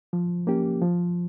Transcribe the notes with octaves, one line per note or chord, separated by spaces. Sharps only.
F3
A#3 C#4 G4
F3